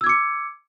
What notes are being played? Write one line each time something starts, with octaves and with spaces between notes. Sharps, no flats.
D6 E6 G#6 C#7